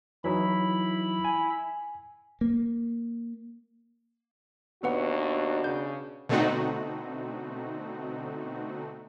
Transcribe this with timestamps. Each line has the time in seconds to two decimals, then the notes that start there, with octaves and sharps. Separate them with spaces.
0.24 E3 F#3 D#4 E4 B5
1.24 G#5
2.41 A#3
4.83 D#2 B2 B3 D4 F#4 B4 F#5
5.64 C#3 G6
6.29 B2 D3 A3 C4 D#4 F#4